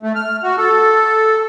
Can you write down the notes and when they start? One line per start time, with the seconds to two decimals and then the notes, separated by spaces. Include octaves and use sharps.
0.03 A3
0.16 F6
0.43 F#4
0.57 A4